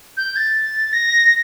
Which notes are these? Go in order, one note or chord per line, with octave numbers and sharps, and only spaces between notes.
G6
A6
A#6